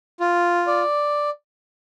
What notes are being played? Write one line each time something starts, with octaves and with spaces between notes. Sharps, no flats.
F4
D5